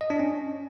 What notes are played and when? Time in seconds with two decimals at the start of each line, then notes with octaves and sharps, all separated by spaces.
0.01 D#5
0.10 D4
0.19 C#4